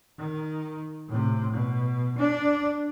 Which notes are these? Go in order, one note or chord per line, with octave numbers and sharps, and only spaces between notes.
D#3
A2 C3
B2
D4